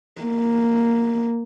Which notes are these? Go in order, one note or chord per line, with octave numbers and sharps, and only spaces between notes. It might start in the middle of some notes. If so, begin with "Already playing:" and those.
A#3